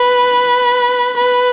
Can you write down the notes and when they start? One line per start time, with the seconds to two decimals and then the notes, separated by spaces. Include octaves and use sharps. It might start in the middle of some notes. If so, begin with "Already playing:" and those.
Already playing: B4
1.17 B4